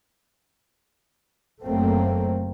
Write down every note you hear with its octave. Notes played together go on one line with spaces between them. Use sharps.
F#1 F#3 A3 A#3 C4